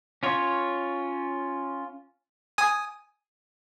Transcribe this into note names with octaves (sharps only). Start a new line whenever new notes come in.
C#4 F4 C#5
G#5 D#6